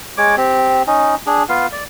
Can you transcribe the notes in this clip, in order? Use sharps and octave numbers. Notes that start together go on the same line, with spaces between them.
G#3 C#5 D6
C4 G4
C#4 D#4
D4 G#4
B3 F4 F5
D5